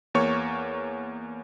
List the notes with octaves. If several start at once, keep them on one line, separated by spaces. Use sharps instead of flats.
E2 A#3 C#5 C#6